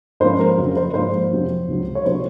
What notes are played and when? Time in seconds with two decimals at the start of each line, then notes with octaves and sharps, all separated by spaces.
0.20 G#2 F3 A#3 C#4 C5
0.40 A#4
0.57 F2 C#3 F#3 A#3
0.77 C5
0.94 G#2 F3 A#3 C5
1.31 F2 C3 F#3
1.68 C#2 C3 F#3
1.95 C#5
2.05 C3 F#3 A#3 C5